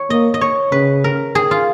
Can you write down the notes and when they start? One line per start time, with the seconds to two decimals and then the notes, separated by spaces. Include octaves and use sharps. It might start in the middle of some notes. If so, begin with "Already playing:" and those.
Already playing: C#5
0.10 A#3 D#5
0.34 D#5
0.41 C#5
0.72 C#3 B4
1.04 A#4
1.35 G#4
1.51 F4